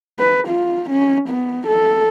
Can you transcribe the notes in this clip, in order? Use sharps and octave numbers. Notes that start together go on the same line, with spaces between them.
B4
F4
C#4
B3
A4